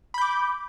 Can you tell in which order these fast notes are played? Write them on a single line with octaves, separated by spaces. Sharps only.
B5 G6 D6